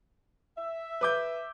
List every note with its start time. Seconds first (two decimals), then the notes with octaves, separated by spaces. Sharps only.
0.58 E5
1.01 B4 D6 G6